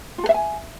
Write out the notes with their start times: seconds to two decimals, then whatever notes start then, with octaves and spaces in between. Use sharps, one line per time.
0.18 F4
0.24 A4
0.29 E5
0.34 G#5